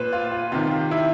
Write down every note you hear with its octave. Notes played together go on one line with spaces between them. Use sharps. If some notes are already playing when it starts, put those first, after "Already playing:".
Already playing: A#2 B4 C5
F4
F4
C3 D#3 F4
E4